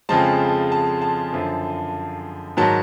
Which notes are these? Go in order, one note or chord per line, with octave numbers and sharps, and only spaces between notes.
F2 C#3 F3 G#3 A5
A5
A5
F#2 D3 F3
G#2 D#3 F#3 A5